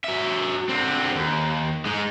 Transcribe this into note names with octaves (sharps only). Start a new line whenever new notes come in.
F#3 E5
D3 C4
D#2
G#3 D#4